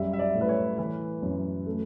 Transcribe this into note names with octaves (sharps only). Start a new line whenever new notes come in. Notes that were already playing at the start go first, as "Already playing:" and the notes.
Already playing: F#2 G3 E5
E5
D5
A2
B4
C#5
E3 B4
F#2
A3